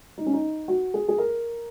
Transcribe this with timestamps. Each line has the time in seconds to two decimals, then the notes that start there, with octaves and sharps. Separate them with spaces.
0.18 D#4
0.26 C#4
0.33 D#4
0.68 F#4
0.94 G#4
1.08 G#4
1.18 A#4